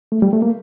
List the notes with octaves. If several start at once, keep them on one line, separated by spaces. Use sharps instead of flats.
A3
G3
A3
A#3